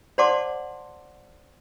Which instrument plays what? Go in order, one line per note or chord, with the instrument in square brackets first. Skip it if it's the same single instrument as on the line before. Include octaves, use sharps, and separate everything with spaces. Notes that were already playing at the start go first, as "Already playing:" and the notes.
[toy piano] C5 D5 F#5 A5 C6 D6